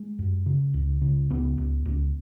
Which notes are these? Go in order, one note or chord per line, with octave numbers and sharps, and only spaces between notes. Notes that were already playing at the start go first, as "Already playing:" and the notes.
Already playing: G#3
F#2
C#3
C#2
C#3
C#2 B3
C#2
C#2